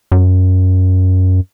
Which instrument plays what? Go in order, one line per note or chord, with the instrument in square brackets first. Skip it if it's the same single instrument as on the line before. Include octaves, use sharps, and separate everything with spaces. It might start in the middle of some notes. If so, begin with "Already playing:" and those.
[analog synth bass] F#2